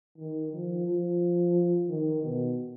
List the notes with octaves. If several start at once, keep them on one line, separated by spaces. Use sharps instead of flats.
D#3
F3
F3
D#3
B2